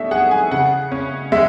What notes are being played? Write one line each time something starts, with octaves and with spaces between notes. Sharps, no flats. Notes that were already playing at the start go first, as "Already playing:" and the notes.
Already playing: B2 A3 D4 E5
G#4 F#5
G#5
C#3 F#5
C#4
G#3 E5